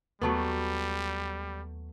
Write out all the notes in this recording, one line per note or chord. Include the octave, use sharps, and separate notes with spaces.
D#2 F#3 G3 A3 B3